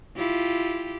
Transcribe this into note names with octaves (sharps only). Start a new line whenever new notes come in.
E4 F4 G4